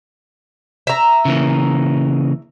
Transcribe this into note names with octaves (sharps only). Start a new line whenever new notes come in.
E5 A#5
C#3 E3 A#3